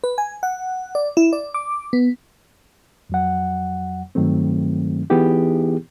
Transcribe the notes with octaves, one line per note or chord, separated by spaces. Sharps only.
B4
G#5
F#5
D5
E4
D5
D6
B3
F2 F#3 F#5
G2 D#3 F#3 A3 C4
E3 B3 D#4 E4 G4 G#4